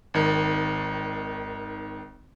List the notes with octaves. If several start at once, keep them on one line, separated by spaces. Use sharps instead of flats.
G#1 D#3